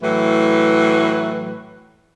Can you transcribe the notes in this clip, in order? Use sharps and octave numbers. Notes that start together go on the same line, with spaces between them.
A2 E3 F#3 B4